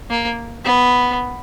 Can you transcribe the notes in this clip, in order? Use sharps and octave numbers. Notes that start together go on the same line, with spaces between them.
A#3
B3